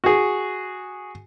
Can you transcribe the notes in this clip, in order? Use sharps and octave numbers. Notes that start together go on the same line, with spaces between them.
F#4 G#4